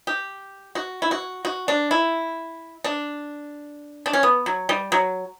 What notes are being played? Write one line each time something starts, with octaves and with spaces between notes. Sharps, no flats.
G4
F#4
E4
F#4
F#4
D4
E4
D4
D4
C#4
B3
F#3
G3
F#3